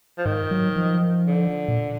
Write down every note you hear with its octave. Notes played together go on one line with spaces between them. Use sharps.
F3
G#2 D#3
F#3
F3
D3
A#2